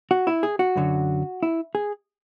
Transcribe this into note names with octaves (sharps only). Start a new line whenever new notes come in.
F#4
E4
G#4
F#4
F#2 D3 F#3
E4
G#4